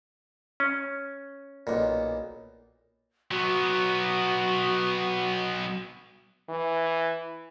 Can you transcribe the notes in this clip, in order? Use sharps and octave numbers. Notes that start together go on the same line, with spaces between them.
C#4
B1 A#2
F#3 B3 F#4
E3